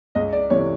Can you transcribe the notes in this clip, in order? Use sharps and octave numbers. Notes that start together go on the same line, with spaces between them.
C#2 D#5
D5
C3 E3 A3 C#5